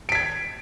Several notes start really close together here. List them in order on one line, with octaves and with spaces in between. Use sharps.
D7 B6 G#6